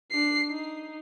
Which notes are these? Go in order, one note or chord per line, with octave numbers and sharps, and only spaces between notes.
D4 C7
D#4